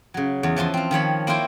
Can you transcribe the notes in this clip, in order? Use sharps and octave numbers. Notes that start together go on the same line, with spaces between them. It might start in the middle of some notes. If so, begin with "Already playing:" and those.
C#3 F#3
E2
E3 F3 A5 C6
C4 F5
D#3 F3 C#5 B5
A#3 E4 F4 A#4 C5 G5